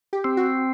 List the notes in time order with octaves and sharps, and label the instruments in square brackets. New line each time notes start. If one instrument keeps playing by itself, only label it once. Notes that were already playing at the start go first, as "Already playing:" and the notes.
[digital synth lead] G4
[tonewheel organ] C4
[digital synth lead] F#4